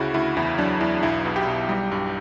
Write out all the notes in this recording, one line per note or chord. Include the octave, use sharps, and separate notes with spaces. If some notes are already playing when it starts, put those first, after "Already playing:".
Already playing: D2 C#3 E4 F#4
D2 E4
E2 E4
F#3 D4
E2 E4
B1 E4
B2
G4
B1
G3
G2